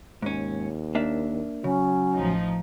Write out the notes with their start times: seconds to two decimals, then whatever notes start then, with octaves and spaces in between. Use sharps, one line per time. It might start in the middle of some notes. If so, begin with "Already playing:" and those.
0.22 D#2 G#2 C#4
0.95 A#3 D4 E5
1.64 C#3 F#3 C#4
2.17 A1 F3 D#4